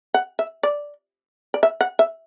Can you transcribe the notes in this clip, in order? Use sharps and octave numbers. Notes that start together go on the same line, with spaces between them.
F#5
E5
D5
D5
E5
F#5
E5